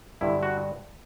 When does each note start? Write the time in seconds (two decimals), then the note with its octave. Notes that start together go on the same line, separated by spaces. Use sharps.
0.21 G2 D3 E4
0.43 F#4